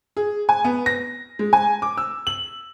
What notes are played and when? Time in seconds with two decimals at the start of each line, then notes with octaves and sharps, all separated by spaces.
0.17 G#4
0.49 G#5
0.64 B3
0.86 A#6
1.39 G#3
1.53 G#5
1.82 D6
1.97 E6
2.27 F#7